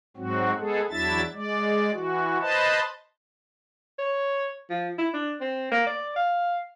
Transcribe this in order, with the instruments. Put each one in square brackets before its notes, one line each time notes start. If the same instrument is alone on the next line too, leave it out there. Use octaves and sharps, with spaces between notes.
[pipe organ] G#2 F#3 C4 F#4
G#3 B3 G#4 A4
E2 F#3 D4 E4 E5 A6
G#3 D5
E3 F#4
B4 C5 D#5 A5
[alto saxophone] C#5
F3
E4
D4
C4
A#3
D5
F5